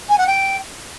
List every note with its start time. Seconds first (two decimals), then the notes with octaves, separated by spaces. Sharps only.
0.09 G#5
0.18 F#5
0.26 G5